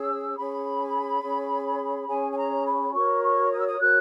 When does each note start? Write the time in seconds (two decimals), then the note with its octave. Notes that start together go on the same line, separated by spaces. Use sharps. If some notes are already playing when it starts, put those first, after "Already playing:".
Already playing: C#4 G#4 C#5 E6
0.37 C#4 G#4 C#5 B5
1.23 C#4 G#4 C#5
2.08 C#4 G#4 C#5 G#5
2.31 G#5
2.37 A#5
2.65 B5
2.93 F#4 A#4 C#5 C#6
3.22 C#6
3.51 D#6
3.59 E6
3.66 D#6
3.79 F#4 A#4 C#5 F#6